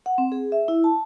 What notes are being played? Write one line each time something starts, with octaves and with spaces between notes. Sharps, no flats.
F#5
C4
G#4
E5
E4
A5